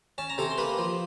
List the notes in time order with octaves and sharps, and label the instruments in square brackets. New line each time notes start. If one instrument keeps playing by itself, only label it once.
[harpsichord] C#4 A5
A#5
C3 A4 A5
C6
A#3 B4 B5
F3